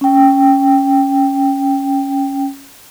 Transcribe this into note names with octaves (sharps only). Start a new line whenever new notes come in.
C#4 G5